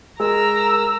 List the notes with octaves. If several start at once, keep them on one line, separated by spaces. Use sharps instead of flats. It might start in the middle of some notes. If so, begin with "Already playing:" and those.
G#3 A#4 A#5 E6